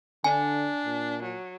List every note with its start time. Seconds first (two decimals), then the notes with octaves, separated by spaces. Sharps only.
0.24 D3 D4 G#5
0.85 A#2
1.23 F#3